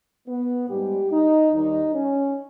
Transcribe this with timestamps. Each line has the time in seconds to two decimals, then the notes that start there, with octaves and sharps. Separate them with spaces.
0.28 B3
0.70 G#2 G3 G4
1.11 D#4
1.52 D#2 D#3 G3 D#4
1.94 C#4